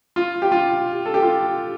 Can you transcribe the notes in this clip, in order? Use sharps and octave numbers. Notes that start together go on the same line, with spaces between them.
F4
G4
F4
A4
G4
F4